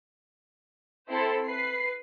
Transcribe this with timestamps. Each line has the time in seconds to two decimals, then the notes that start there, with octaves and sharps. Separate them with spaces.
1.09 C4 E4 A4 C5
1.44 B4 C7